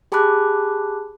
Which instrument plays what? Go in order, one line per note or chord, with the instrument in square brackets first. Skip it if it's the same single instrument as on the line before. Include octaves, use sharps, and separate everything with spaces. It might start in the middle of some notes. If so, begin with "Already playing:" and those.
[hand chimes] G4 G#4 A5 B5 D6 F#6